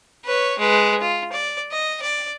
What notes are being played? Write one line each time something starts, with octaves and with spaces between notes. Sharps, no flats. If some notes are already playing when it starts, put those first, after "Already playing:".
B4 C#5
G#3 B4
F4
D5
D#5
D5